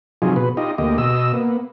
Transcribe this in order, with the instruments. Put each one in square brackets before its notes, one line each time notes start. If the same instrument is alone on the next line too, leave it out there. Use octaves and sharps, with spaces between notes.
[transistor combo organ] C3 F3 F#3 D#4 F4 G#4
B2 B4
D#4 F4 G4 D#5
D2 A#3 G4 D#5
B2 D#5 E6
A#3 B3